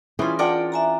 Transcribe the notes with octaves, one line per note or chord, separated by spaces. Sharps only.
E3 G3 C#4 F4 G#4
D4 F4 A#4 D5 F#5 G5
E5 G#5 A#5